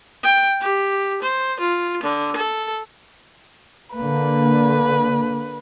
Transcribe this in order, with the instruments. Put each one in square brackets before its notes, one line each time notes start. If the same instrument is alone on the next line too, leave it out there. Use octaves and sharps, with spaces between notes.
[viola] G5
G4
C5
F4
D3
A4
[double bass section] D3 A#3 [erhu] B4